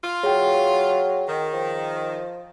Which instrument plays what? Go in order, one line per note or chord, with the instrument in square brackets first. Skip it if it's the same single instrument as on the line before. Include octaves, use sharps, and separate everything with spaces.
[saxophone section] F4
[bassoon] F#3 [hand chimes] G#4 G5
[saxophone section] D#3
[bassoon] F3